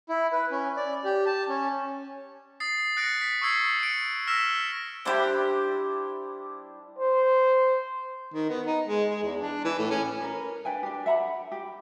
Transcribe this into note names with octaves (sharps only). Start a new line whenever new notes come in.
E4
B4
C#4
D5
G4
A5
C#4
D#6 A6 C7
D#6 F#6 A6 A#6 C#7 D7
B6
C#6 D#6 E6 G#6 C7
C#7 D7
E6 F6 A#6 B6 E7
G3 D4 E4 G4 C5
C5
D#3
B3
D#4
G#3
G#3
E2
D4
E3
A2
C#4
A#4 B4
D4 B4 G5 G#5
D4 G4
E5 F#5 A#5 B5
G4